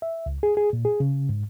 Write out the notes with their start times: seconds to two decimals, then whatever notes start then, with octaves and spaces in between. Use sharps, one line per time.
0.02 E5
0.26 C#2
0.43 G#4
0.57 G#4
0.73 A#2
0.85 G#4
1.00 C#3
1.29 G#2